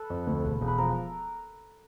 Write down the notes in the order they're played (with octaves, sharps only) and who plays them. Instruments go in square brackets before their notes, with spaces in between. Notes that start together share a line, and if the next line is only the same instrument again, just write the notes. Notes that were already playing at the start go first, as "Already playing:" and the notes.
Already playing: [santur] A4 B4
[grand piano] F2
D2
E1
E1
[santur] B4
[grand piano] F3 [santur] A#4